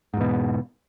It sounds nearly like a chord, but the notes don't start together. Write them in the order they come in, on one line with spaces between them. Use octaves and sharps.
G#2 E2 B2